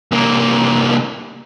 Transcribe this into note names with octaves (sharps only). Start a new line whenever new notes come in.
C2 A#3